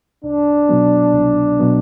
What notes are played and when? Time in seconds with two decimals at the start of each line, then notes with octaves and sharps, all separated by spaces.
0.23 C2 D4
0.69 B2 F#3 B3
1.14 C2
1.59 B2 F#3 B3